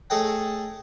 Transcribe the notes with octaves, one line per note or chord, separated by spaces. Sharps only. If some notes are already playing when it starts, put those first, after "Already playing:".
A3 G#4 A4 C#5 D#5 G5